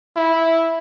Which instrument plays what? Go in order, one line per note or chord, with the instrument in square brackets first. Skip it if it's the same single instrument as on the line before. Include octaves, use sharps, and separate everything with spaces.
[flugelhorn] E4